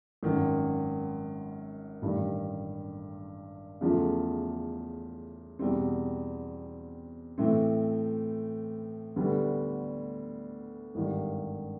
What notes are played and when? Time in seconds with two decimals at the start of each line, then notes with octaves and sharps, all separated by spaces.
0.23 G#1 F#2 D#3
2.02 A1 G2 D#3
3.81 E2 C#3 F3 A3
5.59 E2 B2 G3 C4
7.38 A2 E3 A3 C4
9.16 D2 D3 G3 B3
10.95 G#1 G2 D#3